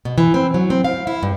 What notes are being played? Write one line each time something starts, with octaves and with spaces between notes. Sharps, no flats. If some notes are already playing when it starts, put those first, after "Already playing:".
B2
E3
C4
F#3
C4
F5
E4
G2